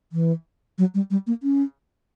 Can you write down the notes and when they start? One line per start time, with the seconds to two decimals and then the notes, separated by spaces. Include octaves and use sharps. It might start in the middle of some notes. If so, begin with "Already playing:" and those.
0.12 E3
0.78 F#3
0.94 G3
1.11 G3
1.27 A#3
1.43 C#4